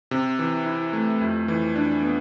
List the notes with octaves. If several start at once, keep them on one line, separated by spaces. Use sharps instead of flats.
C3
E3
E4
A3
F2
E3
D4
B3